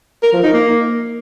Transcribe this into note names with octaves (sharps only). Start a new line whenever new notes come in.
A#4
F3
D#4
A#3